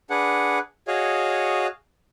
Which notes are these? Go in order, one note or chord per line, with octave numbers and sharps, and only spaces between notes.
D4 G#4 B4 F#5
F#4 G#4 C#5 D#5 F5